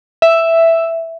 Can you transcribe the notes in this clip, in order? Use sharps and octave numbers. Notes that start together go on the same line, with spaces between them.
E5